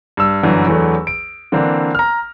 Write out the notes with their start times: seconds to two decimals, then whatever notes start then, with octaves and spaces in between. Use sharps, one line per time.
0.17 G2 E6
0.43 G1 F#2 D3 E3 F#3
0.67 E2 E3 F#3 A3 D4
1.07 D7
1.52 D3 E3 A#3 C4 D4
1.95 A#5 F6